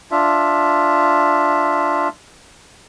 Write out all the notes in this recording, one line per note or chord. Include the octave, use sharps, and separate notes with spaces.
D4 F4 E5